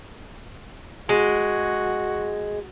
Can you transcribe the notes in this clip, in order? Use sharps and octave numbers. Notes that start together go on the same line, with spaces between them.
G#3 F#4